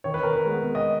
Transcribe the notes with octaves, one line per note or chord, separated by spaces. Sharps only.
D#3 C#5
B4
A#4
B4
G#3 B3
D#5